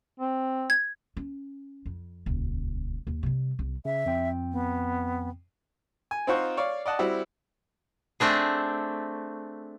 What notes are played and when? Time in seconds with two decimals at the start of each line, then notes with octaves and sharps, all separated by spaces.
0.20 C4
0.70 G#6
1.17 C#4
1.86 F2
2.26 D#1 C#2
3.07 D#2
3.23 C3 G3
3.59 C2
3.85 C#3 E5
4.06 F2 C4 G5
4.52 B3
6.11 G#5
6.27 C4 D#4 F4 C5 F#5 C#6
6.57 C#5 D5 F5
6.86 D5 D#5 F#5 A5
6.99 G3 C4 E4 F#4
8.20 A3 C4 D4 G#4